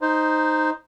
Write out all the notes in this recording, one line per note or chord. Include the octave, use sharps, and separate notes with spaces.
D#4 C5